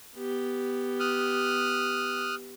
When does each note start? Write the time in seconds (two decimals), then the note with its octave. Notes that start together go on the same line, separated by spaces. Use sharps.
0.16 B3 G4
1.00 D#6 F6 F#6